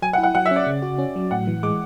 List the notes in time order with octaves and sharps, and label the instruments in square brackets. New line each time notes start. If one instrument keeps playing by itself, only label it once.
[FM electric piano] F#3 [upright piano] G#5
[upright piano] F#5
[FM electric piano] E4
[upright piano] F#5
[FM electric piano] F#3 [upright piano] F#5
[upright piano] E5
[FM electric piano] C#4 [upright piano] D5
[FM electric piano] C#3
F#4
C#4
F#3
[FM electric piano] A2 [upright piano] F#5
[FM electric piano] E3
[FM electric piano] G#3 [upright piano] D6